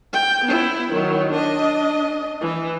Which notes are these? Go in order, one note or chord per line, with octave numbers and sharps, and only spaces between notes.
G5
B3 E4
D#3 F#3
D4 D#5
E3